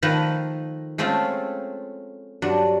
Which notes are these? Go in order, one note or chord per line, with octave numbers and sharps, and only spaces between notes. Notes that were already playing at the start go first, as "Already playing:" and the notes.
D#3 F3 A3 B4 A#5
G#3 A3 C4 C#4 F4
G2 F#3 D4